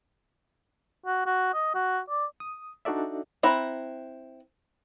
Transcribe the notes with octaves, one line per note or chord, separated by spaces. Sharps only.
F#4
F#4
D#5
F#4
D5
D#6
D4 D#4 F#4 A4 D5 E5
C4 E4 F#5 A#5